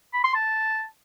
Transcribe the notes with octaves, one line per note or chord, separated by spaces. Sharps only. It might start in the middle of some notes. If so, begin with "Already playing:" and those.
B5
C6
A5